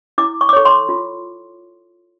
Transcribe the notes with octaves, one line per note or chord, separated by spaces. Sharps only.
E4 D6
C#6
D6
A4 C#5 C#6
C6
F4